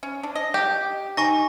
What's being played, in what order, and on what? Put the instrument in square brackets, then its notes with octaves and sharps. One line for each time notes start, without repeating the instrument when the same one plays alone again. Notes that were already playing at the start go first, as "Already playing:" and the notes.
[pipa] C#4
D4
D#5
[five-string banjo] G4
[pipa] D#4 [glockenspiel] G#5 C#6 A#6